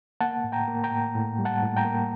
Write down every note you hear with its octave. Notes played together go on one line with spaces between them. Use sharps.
A#3 F#5 A5
A2
G5 A#5
A#3
G5 A#5
A2
A2
G3
F#5 A5
A2
G5 A#5
A#3